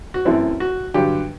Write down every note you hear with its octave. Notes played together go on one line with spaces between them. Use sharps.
F#4
F#2 E3 A3 C4 E4
F#4
G2 D3 F#3 G4